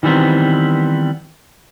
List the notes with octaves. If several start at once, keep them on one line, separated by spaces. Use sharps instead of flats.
D#3 E3 G3 B3 C4